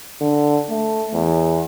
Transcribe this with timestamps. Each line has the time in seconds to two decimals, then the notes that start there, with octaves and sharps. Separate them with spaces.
0.21 D3
0.69 A3
1.13 E2